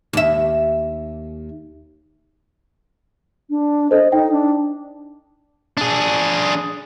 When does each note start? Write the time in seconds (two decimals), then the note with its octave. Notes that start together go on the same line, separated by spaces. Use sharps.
0.13 D#2 E5
3.50 D4
3.91 A4 C5 D#5
4.12 D#4 G5
4.32 D4
5.77 D4 G#4